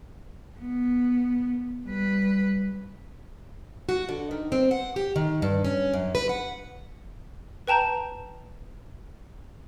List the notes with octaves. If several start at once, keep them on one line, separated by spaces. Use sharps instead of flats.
B3
G3 B4
F#4
D3
D#3
C4
F#5
G4
D#3
G2
C#4
F#2
B4
F#5
B4 G5 A5 A#5 G6